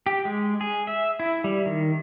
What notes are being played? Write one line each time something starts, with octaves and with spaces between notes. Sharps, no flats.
G4
G#3
G#4
E5
E4
G3
D#3